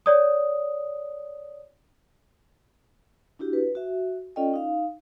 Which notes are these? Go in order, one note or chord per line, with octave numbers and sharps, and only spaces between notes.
C#5 D5 D#6
D4 E4 F#4 G4
B4
F#4 E5
C#4 F4 A4 D5 D#5 G5
D#4 F5